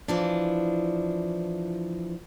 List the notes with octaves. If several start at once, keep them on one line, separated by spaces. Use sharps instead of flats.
E3 F3 D4